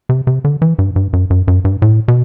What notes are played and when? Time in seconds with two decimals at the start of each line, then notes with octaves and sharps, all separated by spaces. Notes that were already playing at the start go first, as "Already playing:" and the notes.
0.09 C3
0.27 C3
0.44 D3
0.62 E3
0.79 G2
0.96 G2
1.13 F#2
1.30 F#2
1.48 F#2
1.65 G2
1.82 A2
2.08 B2